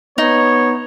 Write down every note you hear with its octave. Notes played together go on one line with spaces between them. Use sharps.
B3 D#4 C#5